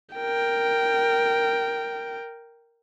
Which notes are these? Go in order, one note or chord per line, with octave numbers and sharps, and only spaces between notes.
A#4 G5